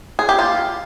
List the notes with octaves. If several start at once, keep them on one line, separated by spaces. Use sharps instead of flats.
G#4
G4
F4